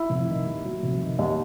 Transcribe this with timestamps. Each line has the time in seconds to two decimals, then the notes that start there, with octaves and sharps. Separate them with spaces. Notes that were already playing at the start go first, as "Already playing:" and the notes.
Already playing: E4
0.10 F1
0.28 D#3
0.45 D#2
0.65 F#3
0.83 F1
1.01 D#3
1.19 D#2